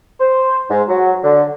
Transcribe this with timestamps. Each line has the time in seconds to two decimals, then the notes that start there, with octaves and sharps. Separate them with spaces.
0.19 C5
0.70 G#2
0.88 F#3
1.23 D3